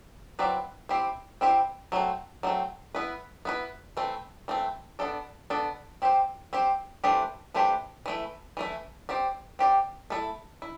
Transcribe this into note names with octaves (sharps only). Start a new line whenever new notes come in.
F#3 C4 E4 B4 D5
C4 E4 G4 C5
C4 E4 G4 C5
F#3 A3 C4
F#3 A3 C4
B3 E4 B4
B3 E4 B4
E3 A3 C4
E3 A3 C4
B3 D4 A4 D5
B3 D4 A4 D5
C4 G4 C5
C4 G4 C5
E3 A3 D4 G4 C5
E3 A3 D4 G4 C5
E3 A3 E4
E3 A3 E4
C4 G4 D5
C4 G4 D5
A3 E4 A4
E4